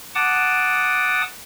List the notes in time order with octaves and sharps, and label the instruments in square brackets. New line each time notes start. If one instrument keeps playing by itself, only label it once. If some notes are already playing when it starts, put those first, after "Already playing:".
[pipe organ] F#5 A5 D6 D#6